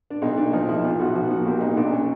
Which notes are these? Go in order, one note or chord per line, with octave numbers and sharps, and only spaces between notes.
D4
B1 D#4
A#2 D4
F3 D#4
B1 E4
B1 F4
B1 F#4
F3 F#4
A#2 F#4
B1 G4
A#2 D#4
B1 D4
C#4